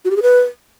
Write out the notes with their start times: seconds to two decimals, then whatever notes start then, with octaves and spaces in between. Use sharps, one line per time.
0.05 F#4
0.11 G4
0.16 G#4
0.22 B4